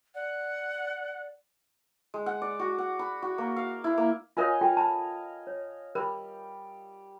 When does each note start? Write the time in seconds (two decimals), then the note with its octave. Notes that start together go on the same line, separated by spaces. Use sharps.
0.15 D5 F#5
2.14 G#3
2.26 F#5
2.42 D5
2.59 F#4
2.78 F#5
2.99 B5
3.22 F#4
3.38 A#3
3.56 F5
3.84 E4
3.98 A#3
4.37 F4 A#4 C#5 D#5 F5 G#5
4.61 F4 A4 G5
4.77 A5 B5
5.47 C#5
5.95 G3 A#4 B5